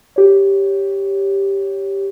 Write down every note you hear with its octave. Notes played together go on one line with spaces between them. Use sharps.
G4 C#5